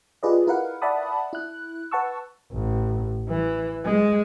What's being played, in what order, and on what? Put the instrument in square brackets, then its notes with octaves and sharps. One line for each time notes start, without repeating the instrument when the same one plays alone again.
[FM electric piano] F4 G4 G#4 B4 D5 D#5
E4 A#4 B4 F5 F#5
D5 E5 F#5 A5 B5 D#6
E4 F#6
B4 F#5 A5 C#6 E6
[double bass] A1
E3
G#3